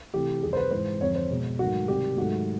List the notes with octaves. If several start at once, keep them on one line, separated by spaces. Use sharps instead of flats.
C3 E3 A3 G4
F2 C3 D#3 G3 G#4
C5
B4
G#2 E3 G#3 C5
F2 D3 F3 C#5
C5
B2 G#3
G#2 D#3 F#3 A3 F#4
C3 D#3 G3 G4
G#2 D#3 F#3 A3 F#4